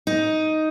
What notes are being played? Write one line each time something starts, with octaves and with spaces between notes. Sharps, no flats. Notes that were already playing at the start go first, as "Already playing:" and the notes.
D#4